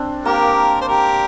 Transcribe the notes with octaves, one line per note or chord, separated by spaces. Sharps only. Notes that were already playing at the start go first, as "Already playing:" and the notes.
Already playing: C4 D4
A#3 G4 A#4
C5
G4 A#4